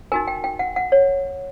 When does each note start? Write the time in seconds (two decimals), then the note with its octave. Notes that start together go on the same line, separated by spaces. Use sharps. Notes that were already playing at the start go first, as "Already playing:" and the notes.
0.12 D#4 F#4 A#4 G#5
0.28 G5
0.44 G5
0.59 F#5
0.76 F#5
0.92 C#5